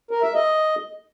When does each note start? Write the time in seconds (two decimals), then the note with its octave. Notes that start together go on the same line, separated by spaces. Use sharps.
0.11 A#4
0.22 E5
0.34 D#5